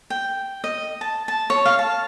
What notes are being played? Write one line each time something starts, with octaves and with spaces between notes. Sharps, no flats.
G5
D#5
A5
A5
C#5
F5
A5